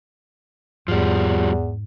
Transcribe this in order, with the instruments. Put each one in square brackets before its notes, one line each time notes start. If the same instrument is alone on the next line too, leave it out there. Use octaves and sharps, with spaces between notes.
[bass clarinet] E2 [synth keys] G#2 [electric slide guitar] F3 G3